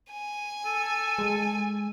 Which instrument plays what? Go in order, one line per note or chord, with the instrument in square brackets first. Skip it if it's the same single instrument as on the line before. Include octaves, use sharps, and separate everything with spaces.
[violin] G#5
[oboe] A4
[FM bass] G#3